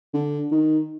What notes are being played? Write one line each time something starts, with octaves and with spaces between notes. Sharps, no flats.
D3
D#3